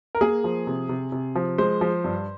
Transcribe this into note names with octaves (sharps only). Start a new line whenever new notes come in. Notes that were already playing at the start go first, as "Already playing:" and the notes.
A#4
A#3 G#4
F3
C3
C3
C3
F3
G#3 C5
F3
G2